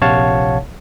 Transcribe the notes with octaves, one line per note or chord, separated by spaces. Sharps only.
A#1 C3 C#5 F5 F#5 A5